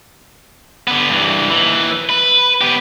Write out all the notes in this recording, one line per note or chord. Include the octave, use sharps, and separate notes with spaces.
D3 B3
G2 E3
D#2 E3
B4
B3 G4